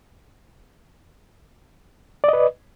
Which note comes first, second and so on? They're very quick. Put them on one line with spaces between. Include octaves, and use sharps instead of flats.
D5 D#5 B4